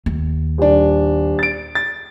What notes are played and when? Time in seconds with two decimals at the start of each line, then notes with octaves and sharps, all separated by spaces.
0.06 D#2
0.58 D#1 D4
1.39 A6 D7
1.75 A6